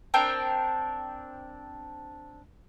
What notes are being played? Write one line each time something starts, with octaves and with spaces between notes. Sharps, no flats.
C4 D4 A#4 G5